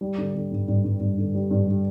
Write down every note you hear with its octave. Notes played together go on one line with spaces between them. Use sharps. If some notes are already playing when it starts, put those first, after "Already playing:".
G3
D3
D3
G2
G2
G2
G2
D3
G3
G2
G3